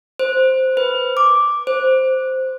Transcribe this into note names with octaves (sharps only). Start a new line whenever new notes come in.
C5
B4
D6
C5